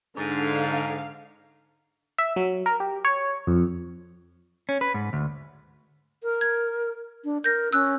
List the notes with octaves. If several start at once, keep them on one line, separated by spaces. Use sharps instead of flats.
G#2 D3 F5
E5
F#3
A#4
G4
C#5
F2
C#4
B4
G#2
D2
A#4
G#6
D4
A#4 G6 A#6
C#4 E6 F#6